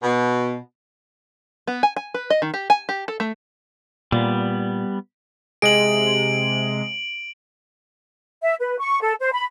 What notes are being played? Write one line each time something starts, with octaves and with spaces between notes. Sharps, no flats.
B2
B3
G#5
G#5
B4
D#5
D#3
G4
G#5
G4
A4
A3
A#2 G3 B3
C3 G#3 G#4 D#5 D7 F#7
E5
B4
C#6
A4
C5
B5